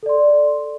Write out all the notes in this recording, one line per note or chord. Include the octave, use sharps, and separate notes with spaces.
A4 D5 C6